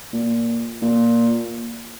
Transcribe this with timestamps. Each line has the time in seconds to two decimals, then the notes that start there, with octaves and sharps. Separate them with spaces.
0.13 A#2
0.82 A#2